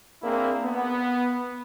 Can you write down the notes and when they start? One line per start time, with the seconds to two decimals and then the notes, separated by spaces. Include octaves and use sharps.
0.22 A#3 C4 D4 E4 G#4
0.65 B3